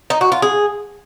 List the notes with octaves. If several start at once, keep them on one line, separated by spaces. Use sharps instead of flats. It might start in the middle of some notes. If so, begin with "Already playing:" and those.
D#4
F#4
F4
G#4